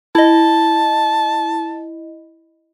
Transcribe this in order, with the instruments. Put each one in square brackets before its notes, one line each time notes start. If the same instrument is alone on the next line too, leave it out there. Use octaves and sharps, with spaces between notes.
[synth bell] E4 D#5 [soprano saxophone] A5